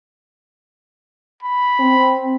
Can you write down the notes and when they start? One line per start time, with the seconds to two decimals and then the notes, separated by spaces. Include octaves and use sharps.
1.43 B5
1.80 C4